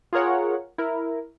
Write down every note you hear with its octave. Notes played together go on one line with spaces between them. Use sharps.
F4 G#4 A#4 C#5 F#5
E4 A#4